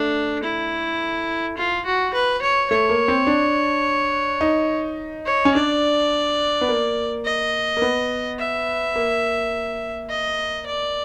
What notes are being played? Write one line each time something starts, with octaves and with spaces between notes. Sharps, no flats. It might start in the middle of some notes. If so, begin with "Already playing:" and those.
Already playing: A3 D4
E4
F4
F#4
B4
C#5
A3 C#5
A#3
C4
D4
D#4
C#5
C#4
D4 D5
B3
A#3
D#5
A#3
B3
E5
A#3
D#5
D5